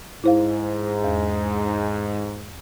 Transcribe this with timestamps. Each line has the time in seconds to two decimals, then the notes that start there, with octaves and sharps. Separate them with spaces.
0.24 G#2 E4 C5 F5
1.04 E2